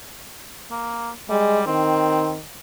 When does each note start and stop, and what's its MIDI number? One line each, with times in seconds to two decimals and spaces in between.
0.71 1.11 58
1.29 1.62 55
1.29 1.61 56
1.67 2.41 51
1.67 2.33 60